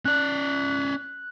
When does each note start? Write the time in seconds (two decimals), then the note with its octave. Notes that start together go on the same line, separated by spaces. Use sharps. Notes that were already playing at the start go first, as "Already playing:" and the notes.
0.05 C#4 D5 F#6